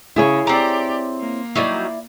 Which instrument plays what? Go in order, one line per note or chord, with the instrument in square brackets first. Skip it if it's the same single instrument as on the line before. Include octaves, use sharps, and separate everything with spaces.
[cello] C#3 [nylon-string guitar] E4 G#4 C#5
[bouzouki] C4 A#5 [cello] G4 D5
[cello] A#3
[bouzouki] F#3 G3 D#4 [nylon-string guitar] E4 D5